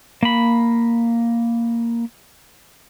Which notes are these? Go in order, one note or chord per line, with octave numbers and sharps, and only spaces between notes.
A#3 B5